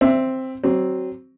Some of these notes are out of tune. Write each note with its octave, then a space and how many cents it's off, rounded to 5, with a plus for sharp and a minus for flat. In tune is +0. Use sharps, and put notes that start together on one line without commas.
C4 +0 E5 +15
F#3 +25 C4 +0